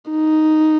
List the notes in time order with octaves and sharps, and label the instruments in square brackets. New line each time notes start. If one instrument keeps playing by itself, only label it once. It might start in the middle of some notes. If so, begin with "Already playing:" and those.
[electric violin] D#4